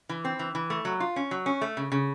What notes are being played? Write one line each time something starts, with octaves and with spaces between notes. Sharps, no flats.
E3
C4
E3
E3
A3
F#3
F4
C#4
F#3
C#4
A3
C#3
C#3